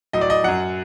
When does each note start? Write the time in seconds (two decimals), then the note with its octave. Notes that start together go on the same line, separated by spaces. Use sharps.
0.13 A2 F#3 D#5
0.21 D5
0.30 D#5
0.44 F#2 F#3 F#5